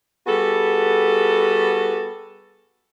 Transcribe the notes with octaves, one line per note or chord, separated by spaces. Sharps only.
G3 B3 F#4 G#4 A4